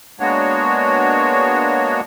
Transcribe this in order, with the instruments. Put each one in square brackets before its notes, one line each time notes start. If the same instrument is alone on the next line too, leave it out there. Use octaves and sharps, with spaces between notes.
[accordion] G#3 A#3 B3 D4 F#4 C#5